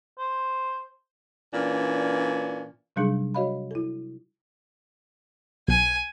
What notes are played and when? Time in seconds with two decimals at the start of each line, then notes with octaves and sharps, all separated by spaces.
0.19 C5
1.54 A#2 E3 C#4 D4
2.96 C3 F#3 G3 D4 D#4 G#4
3.35 F#4 C#5 D#5 F5 B5
3.71 E4 A4
5.68 B1 G#5